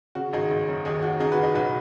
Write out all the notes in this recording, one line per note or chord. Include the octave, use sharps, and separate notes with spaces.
C#3 F#4
G#1 D#4 G#4
G#1
F#2
D#2 D#4 G#4
D#2 F#4
C#3 D#4 G#4
F#4 B4
C#3
D#4 G#4
B1 F#4 B4